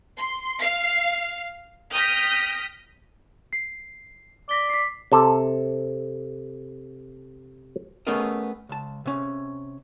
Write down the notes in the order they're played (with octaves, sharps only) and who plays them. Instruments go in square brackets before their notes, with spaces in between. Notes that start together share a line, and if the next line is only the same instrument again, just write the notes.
[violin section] C6
F5 C7
G5 D#6 F6 G6 A#6 B6
[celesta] C7
[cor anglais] D5 [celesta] A#6 B6 G7
[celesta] B6 C7
[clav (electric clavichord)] C3 A4
[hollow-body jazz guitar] A3 B3 C#4 G#4 A#4 D#5
C#2 A5
C3 C#4